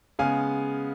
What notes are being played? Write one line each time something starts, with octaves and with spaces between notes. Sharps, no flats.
C#3 G#3 B3 F5 G#5